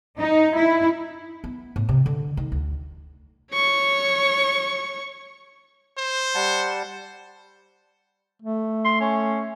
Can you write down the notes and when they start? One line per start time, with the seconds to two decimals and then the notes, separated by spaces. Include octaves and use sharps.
0.19 D#4
0.57 E4
1.44 B3
1.76 A2
1.89 C3
2.06 D3
2.37 D#3
2.52 D2
3.53 C#5 C#6
5.98 C5
6.35 G3 F#5 A5
8.42 A3
8.85 C6
9.01 C#4